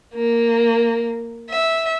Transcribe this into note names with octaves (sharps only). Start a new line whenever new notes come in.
A#3
E5